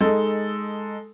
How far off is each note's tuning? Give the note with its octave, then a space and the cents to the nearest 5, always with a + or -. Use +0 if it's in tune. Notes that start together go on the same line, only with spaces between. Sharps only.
G#3 +5 D#4 +0 A4 +0